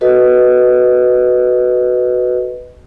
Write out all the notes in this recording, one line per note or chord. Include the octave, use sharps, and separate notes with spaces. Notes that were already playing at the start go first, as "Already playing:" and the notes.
F#4 A4 B4 D#5